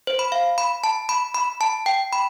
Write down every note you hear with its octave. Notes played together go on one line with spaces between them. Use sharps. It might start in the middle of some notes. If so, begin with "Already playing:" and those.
C5
B5
F5
B5
A5
B5
B5
A5
G5
B5